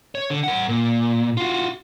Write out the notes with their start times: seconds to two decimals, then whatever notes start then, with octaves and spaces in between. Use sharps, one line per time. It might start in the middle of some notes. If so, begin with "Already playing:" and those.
0.15 C#5
0.30 D3
0.43 A#4 F#5
0.69 A#2
1.37 F4 F#4